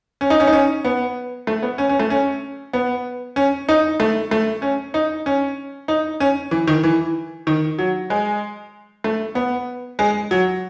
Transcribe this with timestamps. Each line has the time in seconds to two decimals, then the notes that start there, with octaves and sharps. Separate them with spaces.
0.21 C#4
0.30 D#4
0.40 C#4
0.47 D#4
0.53 C#4
0.85 B3
1.47 A3
1.62 B3
1.78 C#4
1.89 C#4
1.99 A3
2.10 C#4
2.73 B3
3.36 C#4
3.69 D#4
4.00 A3
4.31 A3
4.62 C#4
4.94 D#4
5.26 C#4
5.88 D#4
6.20 C#4
6.51 E3
6.67 D#3
6.83 E3
7.47 D#3
7.78 F#3
8.10 G#3
9.04 A3
9.35 B3
9.99 G#3
10.31 F#3